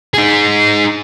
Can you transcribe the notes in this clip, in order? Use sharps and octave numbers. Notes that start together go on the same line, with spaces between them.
D#4 G#4